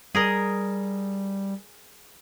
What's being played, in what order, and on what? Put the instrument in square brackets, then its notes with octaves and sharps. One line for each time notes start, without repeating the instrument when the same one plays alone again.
[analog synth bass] G3 [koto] G#4 A#4 D#5